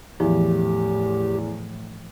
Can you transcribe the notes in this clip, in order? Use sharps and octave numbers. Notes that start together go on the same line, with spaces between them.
E2 A2 E3 F3 G4